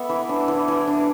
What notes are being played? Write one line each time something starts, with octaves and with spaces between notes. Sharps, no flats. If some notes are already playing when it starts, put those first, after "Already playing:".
Already playing: B3 A4 D5 E5
E3
D4
E3
E3
D4